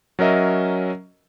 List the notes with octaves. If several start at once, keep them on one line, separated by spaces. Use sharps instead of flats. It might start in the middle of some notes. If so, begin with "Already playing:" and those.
F#3 C#4 A#4 D#5 E5